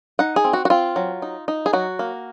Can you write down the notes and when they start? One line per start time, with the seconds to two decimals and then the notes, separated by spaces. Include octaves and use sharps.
0.19 D#4 F#5
0.36 G#4
0.44 C4
0.53 F#4
0.65 F#4
0.70 C4 F4
0.96 F#3
1.22 D#4
1.48 D#4
1.66 G#4
1.73 F#3 F#4
1.99 A#3